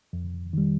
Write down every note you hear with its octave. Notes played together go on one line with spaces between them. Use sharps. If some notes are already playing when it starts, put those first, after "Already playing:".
F2
D#3 G3